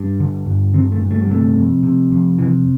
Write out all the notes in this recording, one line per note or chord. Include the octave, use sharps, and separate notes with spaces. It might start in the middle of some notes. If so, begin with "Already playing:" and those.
Already playing: G2
D3
G2
D3 C4
A3
G2
A3
G3
C3 A3
F2
C3
F2
C3 E3